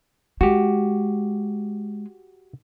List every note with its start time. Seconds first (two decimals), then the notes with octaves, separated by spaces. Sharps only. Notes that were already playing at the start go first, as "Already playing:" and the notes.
0.41 G#3 F#4 G4